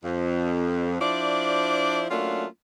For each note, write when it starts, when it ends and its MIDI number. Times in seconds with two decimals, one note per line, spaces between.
0.04 0.96 41
1.00 2.05 53
1.00 2.05 62
1.00 2.05 64
1.00 2.05 72
1.00 2.05 74
2.10 2.46 54
2.10 2.46 57
2.10 2.46 58
2.10 2.46 61
2.10 2.46 62
2.10 2.46 65